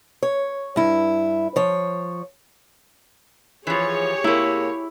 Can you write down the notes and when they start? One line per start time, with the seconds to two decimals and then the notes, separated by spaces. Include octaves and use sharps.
0.23 C#5
0.76 G2 E4
1.56 F3 C#5
3.67 E3 F3 G4 G#4 C#5
4.24 C3 A#3 E4